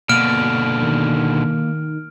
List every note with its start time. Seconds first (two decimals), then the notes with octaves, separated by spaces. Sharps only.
0.09 B2 D3 A#3 F6 D7
0.82 D#3